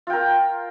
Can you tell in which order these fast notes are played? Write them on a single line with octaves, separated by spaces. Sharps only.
F4 G5 A#4